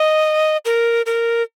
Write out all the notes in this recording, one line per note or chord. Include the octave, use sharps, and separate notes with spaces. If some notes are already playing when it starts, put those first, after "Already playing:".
Already playing: D#5
A#4
A#4